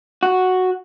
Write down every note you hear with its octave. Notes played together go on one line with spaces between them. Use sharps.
F#4